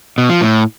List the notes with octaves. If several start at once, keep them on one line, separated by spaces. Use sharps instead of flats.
B2
F3
A2